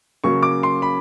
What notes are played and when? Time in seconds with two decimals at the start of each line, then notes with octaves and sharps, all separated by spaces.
0.24 C#3 F#3 A#3 C#6
0.43 D6
0.63 C6
0.82 B5